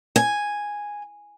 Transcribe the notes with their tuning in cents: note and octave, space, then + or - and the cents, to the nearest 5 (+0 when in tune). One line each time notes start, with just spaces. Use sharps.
G#5 -5